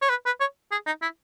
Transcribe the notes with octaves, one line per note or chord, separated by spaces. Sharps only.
C#5
B4
B4
C#5
G#4
D#4
E4